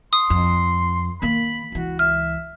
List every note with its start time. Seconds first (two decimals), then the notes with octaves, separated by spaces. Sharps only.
0.13 C6 D#6
0.30 F2
1.22 D#3 A#3 B5
1.72 C#2 E3 F#4
1.99 E5 F6